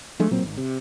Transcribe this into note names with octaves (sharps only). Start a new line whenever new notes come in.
F3 G#3 A3 D4
A#2 F#3 A#3 C4
G#1
C3